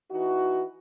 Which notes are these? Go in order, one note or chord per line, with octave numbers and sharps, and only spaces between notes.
E3 D#4 F#4